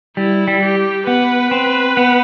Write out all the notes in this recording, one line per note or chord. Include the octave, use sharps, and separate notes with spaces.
G3 E4
G3
G4
B3 B4
C4
B3